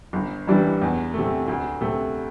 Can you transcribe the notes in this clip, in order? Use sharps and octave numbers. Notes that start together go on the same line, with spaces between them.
G1
G2 E3 G3 D4
E2
C3 A3
D2
C3 A3